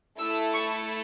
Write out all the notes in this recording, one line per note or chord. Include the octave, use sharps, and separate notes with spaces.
A3 E4 A4 E6
C#6